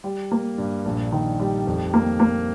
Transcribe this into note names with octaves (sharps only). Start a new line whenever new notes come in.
G3
A#3
G2
A#1
D#3
G3
F2
A#3
A#3